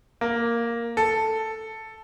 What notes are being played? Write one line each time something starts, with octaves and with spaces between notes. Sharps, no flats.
A#3
A4